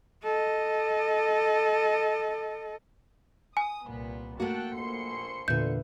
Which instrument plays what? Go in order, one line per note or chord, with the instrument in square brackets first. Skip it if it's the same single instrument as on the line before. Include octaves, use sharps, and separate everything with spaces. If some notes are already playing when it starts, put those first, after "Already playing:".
[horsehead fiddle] A4 D#5
[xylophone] G#5 [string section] D#6
[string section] C2 A#2 B3
[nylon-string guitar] A3 F#4 [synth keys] A#3 [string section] G5 A5 F#6
[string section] A#1 C6 C#7
[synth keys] E2 A#2 D3 [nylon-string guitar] B4 E5 [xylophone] G6